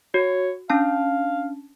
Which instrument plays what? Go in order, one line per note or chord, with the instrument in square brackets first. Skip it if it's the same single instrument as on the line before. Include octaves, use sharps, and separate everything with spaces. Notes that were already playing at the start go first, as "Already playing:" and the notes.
[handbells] F#4 [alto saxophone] C#5
[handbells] C#4 D4 A5 [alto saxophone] F5